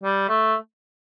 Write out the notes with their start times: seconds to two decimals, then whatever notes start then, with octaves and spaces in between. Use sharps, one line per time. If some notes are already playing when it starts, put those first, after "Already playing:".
0.03 G3
0.29 A3